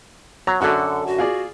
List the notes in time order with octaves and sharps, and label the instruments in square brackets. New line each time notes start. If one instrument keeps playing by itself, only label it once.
[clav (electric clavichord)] F#3 [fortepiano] A#5
[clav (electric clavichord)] F#2 D3 [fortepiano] F#4 [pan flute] A4
[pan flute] F#4
[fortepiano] F4 G#4 D5